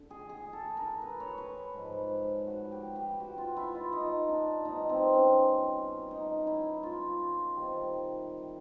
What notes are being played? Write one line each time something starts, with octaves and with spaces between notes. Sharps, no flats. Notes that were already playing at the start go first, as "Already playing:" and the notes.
Already playing: D3
G#4
G#4
A4
A#4
B4
C#5
B4
G#2 F3
F#4
G4
G4
F#4
F4
E4
F4
D#4
D4
B2 G3 D#4
C4
C#4
D#4
E4
F4
C3 D#3 G3